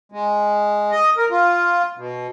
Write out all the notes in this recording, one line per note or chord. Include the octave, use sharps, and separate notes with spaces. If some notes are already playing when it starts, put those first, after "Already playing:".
G#3
D#5
A#4
F4
B2